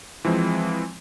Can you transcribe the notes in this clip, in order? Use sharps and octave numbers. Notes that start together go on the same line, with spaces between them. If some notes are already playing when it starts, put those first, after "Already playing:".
E3 F3 G#3 C4